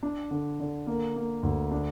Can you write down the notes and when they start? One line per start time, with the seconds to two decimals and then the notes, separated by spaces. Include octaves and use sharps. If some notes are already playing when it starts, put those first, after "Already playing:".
0.03 D4
0.31 D3
0.60 D3
0.87 A#3
1.16 A#3
1.43 D2
1.71 D4